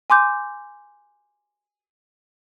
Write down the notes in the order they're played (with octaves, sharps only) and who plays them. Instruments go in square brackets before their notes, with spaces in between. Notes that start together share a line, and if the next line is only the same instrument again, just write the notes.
[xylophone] G#5 C6 D6 G6